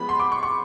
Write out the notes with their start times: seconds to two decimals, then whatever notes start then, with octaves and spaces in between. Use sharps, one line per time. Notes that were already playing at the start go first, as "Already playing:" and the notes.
Already playing: F3 G#3 B3 B5
0.09 C6
0.19 D6
0.32 C#6
0.43 C#6